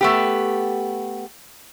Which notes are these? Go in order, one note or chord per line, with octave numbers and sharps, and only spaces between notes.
A3 B3 G4